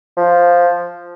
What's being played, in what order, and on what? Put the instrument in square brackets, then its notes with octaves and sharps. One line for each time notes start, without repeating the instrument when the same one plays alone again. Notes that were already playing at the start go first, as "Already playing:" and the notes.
[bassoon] F3